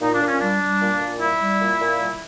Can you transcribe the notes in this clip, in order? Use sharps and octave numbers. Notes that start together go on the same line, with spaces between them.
A#2 D#4
D4
A#2
C#4
G3 D4
G3
A#2
A#2
G3 E4
G3
A#2
A#2
G3